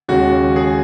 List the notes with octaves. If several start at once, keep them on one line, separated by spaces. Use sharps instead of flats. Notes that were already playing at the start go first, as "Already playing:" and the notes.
D#2 C#3 G#3 C#4 F#4
G#4